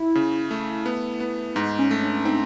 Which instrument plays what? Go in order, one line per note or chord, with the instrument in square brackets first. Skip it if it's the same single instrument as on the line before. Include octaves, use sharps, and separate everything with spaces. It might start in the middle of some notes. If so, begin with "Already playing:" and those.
Already playing: [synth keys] E4
[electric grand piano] C#3
A3
B3
B3
[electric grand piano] G#2 [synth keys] D#4
[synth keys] C#4
[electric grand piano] A3
[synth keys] D4
[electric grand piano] C4 [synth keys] D#4